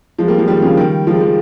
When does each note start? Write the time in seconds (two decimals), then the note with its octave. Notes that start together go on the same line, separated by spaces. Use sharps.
0.18 F3 G#3
0.28 G3 A#3
0.38 F3 G#3
0.48 D#3 G3
0.62 C#3 F3
0.77 D#3 G3
1.07 F3 G#3
1.21 F3 G#3